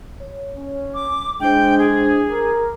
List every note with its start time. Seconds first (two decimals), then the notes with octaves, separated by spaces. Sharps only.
0.20 C#5
0.56 C#4
0.94 D6
1.40 G#3 D4 E4 C5 G5
1.78 G#4
2.30 A#4 D6